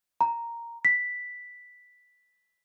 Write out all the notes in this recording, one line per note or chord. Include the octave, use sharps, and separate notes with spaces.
A#5
B6